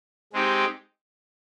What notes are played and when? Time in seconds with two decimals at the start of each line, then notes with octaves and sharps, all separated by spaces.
0.33 G#3 C4 D#4 G4